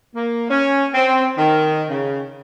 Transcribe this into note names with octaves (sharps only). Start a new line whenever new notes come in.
A#3
C#4
C4
D#3
C#3